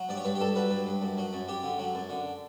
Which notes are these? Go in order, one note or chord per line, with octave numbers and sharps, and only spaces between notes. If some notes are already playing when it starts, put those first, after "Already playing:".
Already playing: F#3
G2 D5
C#5
G2 B4
G4
G2 A4
F#3 B4
G2
G2
F#2
F#3
F#2
F#2 G4
D3
F#3
F#2
D3